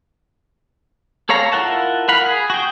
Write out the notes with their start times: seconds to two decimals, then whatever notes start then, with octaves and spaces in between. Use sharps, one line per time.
1.29 G#4 A4 C#5 F5 A#5
1.52 E4 F4 A#4 F#5 A5
2.09 A#4 F5 F#5 B5
2.26 G#4
2.50 F#4 G5